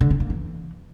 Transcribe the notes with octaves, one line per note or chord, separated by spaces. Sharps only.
D3
C#4
A#3
E3